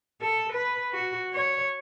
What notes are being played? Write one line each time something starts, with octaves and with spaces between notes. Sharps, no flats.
A4
B4
F#4
C#5